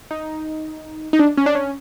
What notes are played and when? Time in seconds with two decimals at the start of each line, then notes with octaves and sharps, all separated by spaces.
0.11 D#4
1.13 D#4
1.19 D4
1.37 C#4
1.46 D4
1.55 C#4